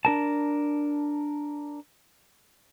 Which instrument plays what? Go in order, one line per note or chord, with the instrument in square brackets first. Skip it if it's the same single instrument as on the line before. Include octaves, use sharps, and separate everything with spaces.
[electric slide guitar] D4 A#4 A5